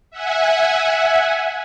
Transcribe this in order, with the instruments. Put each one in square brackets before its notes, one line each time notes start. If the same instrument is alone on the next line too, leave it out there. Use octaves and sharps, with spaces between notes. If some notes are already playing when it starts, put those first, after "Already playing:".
[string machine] E5 F#5 G#5